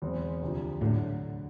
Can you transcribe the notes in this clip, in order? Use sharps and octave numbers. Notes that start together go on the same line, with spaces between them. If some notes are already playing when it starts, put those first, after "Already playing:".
E2 B2 G#3 C4
D2 C3 F3
A2 D3 F#3